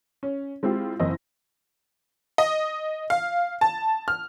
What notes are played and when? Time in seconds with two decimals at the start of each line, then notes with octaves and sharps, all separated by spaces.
0.23 C#4
0.63 G#3 C4 E4 F4 G4
1.00 F#1 E3 C4 E4 D#5 A#6
2.38 D#5
3.10 F5
3.61 A5
4.08 F6